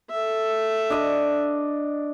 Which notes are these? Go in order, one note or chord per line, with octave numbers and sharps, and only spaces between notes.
A4 E5
D4 D#5 C#6